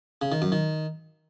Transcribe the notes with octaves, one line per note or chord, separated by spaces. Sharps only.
C#3
D#3
F#2
D#3